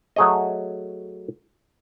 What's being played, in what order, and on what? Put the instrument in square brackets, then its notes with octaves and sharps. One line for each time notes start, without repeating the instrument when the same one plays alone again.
[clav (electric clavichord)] F#3 A3 G#4 C#5 D#5